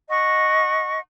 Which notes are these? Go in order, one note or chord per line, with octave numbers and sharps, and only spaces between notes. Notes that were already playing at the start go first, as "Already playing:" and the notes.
D#5 F#5 C#6